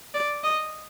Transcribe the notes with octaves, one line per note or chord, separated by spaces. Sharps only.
D5
D#5